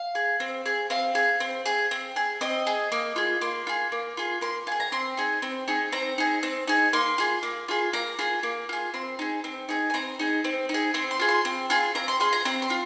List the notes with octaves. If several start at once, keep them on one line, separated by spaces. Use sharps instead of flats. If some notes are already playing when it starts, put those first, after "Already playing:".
Already playing: F5
G#4
C4
G#4
C4 F5
G#4
C4
G#4
C4
G#4
C4 D#5
G#4
A#3
F4 G#4
A#3 C6
F4 G#4
A#3
F4 G#4
A#3 C6
F4 G#4 G#5
A#5
C4 C6
D#4 G#4
C4
D#4 G#4
C4 A#5
D#4 G#4
C4
D#4 G#4
A#3 C6
F4 G#4
A#3
F4 G#4
A#3 A#5
F4 G#4
A#3
F4 G#4
C4 C6
D#4 G#4
C4
D#4 G#4
G#5
C4 A#5
D#4 G#4
C4
D#4
G#4
C4 C6
C6
F4 G#4
C6
C4
F4 G#4
C4 A#5
C6
F4 G#4 C6
A#5
C4 A#5
C6
F4